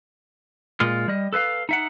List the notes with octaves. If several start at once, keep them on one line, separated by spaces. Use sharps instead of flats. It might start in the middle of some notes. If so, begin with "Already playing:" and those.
A#2 G#3 F4
G3 D#5
A4 B4 E5 F5
D#4 E5 F#5